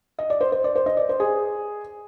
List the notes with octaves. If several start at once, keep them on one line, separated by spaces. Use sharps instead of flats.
D#5
D5
C5
C5
D5
C5
D#5
D5
C5
G#4